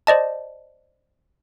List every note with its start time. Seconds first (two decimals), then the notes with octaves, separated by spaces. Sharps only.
0.07 C5 D5 D#5 A5